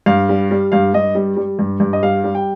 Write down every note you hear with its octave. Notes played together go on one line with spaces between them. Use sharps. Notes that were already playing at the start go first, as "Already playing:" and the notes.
G2 F5
G3
G3
G2 F5
G2 D#5
G3
G3
G2
G2
D#5
G3 F5
G3
G5